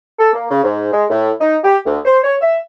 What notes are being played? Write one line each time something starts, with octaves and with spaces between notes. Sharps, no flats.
A4
A#3
C#3
G#2
G#3
A2
D#4
G4
D2
C5
C#5
E5